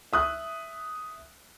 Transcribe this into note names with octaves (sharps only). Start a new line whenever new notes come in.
E5 D#6 F#6